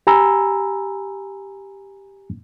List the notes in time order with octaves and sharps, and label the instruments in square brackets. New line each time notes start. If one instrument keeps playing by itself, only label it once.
[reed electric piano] G4 G#5 A#5 B5 E6